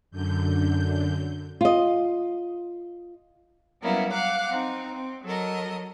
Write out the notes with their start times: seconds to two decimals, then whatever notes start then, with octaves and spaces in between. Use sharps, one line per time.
0.11 F#2 D3 G6
1.61 F4 D#5
3.82 F#3 G3 A#3 B3 C#4 E4
4.13 F5 F#5 D6 F#6
4.50 C4 D#4
4.93 C4
5.24 F#3 A4 A#4 D#5